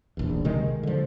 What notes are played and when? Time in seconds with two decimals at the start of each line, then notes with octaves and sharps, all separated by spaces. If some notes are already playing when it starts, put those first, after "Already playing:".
0.17 D1 A#1 E2
0.45 C3 D#3 G#3
0.83 D3 F3